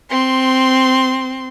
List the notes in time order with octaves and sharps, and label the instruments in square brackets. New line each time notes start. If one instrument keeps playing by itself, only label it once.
[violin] C4 C6